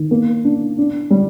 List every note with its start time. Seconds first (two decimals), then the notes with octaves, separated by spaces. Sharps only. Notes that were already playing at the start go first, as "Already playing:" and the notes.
Already playing: D#3
0.11 A#3
0.44 D4
0.78 D4
1.10 G3